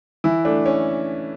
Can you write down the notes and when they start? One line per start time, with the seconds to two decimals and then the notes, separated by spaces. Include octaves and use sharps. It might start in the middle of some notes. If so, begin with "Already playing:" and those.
0.24 E3 E4
0.45 A3 D4
0.66 C#4